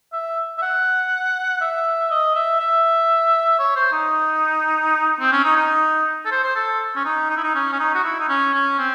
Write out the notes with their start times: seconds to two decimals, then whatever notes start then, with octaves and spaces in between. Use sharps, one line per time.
0.13 E5
0.58 E5
0.62 F#5
1.61 E5
2.10 D#5
2.35 E5
2.60 E5
3.59 C#5
3.76 C5
3.92 D#4
5.20 C4
5.32 C#4
5.44 D#4
5.56 D#4
6.25 A4
6.31 C5
6.44 C5
6.55 A4
6.96 C#4
7.05 D#4
7.30 D#4
7.37 E4
7.44 D#4
7.55 C#4
7.72 C#4
7.79 D#4
7.95 F#4
8.04 E4
8.20 D#4
8.29 C#4
8.53 C#4
8.79 C4